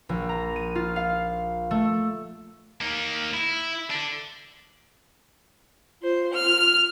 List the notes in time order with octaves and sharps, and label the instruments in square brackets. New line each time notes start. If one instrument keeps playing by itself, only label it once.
[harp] A#1
A#5
D#7
F4
F5
A3
[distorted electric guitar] A#3 D#4
E4
D3 D4
[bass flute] F4 [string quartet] C5
[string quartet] F6